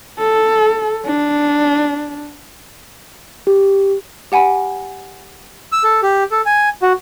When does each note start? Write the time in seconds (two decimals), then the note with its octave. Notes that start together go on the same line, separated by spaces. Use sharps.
0.19 A4
1.06 D4
3.47 G4
4.32 G4 F#5 G#5 B5 D#7
5.72 E6
5.84 A4
6.03 G4
6.31 A4
6.46 G#5
6.82 F#4